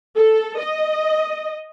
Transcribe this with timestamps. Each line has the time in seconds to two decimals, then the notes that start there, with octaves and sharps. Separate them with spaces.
0.17 A4
0.61 D#5